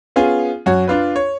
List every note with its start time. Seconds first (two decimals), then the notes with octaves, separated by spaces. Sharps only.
0.16 B3 C#4 F4 G#4
0.66 F#2 F#4 C#5
0.88 D4 F4 B4
1.16 C#5